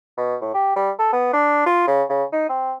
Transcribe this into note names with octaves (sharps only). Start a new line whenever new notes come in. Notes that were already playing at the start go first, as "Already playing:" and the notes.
B2
A2
G4
G3
A4
B3
D4
F4
C#3
C#3
D#4
C4